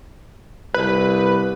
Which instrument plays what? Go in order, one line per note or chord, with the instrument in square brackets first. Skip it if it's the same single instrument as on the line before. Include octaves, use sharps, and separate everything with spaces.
[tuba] C2 [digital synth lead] B4